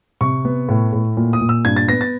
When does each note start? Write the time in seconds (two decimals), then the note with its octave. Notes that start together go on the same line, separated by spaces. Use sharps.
0.21 C3 C#6
0.45 B3
0.69 A2
0.93 A2
1.17 A#2
1.33 D#6
1.41 A#2
1.49 E6
1.65 G2 G#6
1.76 A6
1.89 B3 A#6
2.01 A6